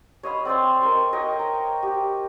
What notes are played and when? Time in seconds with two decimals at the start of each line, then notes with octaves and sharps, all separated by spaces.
0.23 C#5 D#5 F5 B5
0.45 C4 D5 F5 C6
0.81 A#4 D#5 C#6
1.13 C#5 D#5 G5
1.39 A#5
1.83 G4